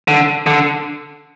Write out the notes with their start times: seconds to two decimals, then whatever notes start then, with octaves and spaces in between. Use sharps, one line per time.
0.08 D3
0.47 D3